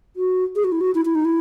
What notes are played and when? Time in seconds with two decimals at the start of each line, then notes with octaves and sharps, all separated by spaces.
0.16 F#4
0.56 G#4
0.64 F#4
0.72 E4
0.81 F#4
0.95 E4
1.05 E4
1.15 D#4
1.25 E4